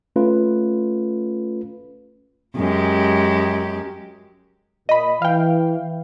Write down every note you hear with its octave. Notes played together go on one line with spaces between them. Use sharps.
A3 C#4 F4 B4
F#2 G#3 G4
A#2 D#5 B5
E3 F5 G5